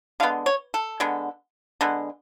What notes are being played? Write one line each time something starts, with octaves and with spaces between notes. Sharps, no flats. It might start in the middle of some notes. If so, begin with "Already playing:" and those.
D3 G#3 B3 F5
C#5
A4
D3 G#3 B3
D3 G#3 B3